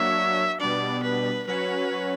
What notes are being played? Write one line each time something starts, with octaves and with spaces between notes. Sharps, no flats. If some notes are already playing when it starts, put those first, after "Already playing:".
Already playing: F#3 A#3 D4 F#4 C#5 E5
B2 G3 B3 D4 D5
B4
F#3 C#4 F#4 B4 C#5